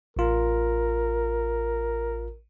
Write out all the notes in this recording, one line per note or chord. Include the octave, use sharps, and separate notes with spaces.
A1 F4 A#4